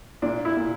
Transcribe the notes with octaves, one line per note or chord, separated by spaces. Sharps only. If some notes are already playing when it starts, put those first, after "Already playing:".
A#2 D4
E4
A#2